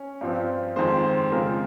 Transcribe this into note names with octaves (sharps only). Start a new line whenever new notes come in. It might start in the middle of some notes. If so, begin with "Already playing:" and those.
Already playing: C#4
G2 F3 C4
F2 D#3 G#3 C5
C5
C#3 F3 G#3 C4 A#4